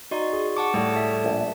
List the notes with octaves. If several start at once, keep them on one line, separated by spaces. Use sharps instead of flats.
D#4 F#4 D5 C6
G#4
F#5 A5 C#6 D6
A2 G3 A4 D5
E5 A5
A#1